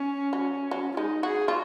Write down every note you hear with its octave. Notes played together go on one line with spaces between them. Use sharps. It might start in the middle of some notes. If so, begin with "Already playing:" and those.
Already playing: C#4
F#3
F#3
F4
G#3 D#4
F#4 G#4
F4 F#4